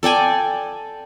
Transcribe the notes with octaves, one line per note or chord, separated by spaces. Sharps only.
A4 D5 G5 G#5